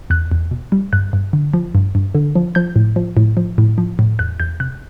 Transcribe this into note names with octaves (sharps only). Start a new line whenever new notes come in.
E2 F#6
E2
B2
G3
G2 F#6
G2
D3
F3
G2
G2
D3
F3
F3 G6
A2
F3
A2
F3
A2
F3
A2
E2 F#6
E2 G6
C3 F#6